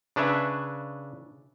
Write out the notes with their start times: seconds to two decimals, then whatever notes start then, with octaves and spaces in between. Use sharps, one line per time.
0.16 C#3 D4 B4 C#5 E5